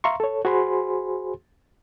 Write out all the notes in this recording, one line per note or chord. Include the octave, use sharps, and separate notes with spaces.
E5 F5 A#5 C6 C#6
A4 C#5
F#4 G#4 C5 G#5 B5 C6